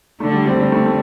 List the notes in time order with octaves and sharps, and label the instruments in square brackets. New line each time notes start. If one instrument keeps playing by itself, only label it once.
[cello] D3 [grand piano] A3
[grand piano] G3
G3 C4
[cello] D3 [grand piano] G3
[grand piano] A3
A3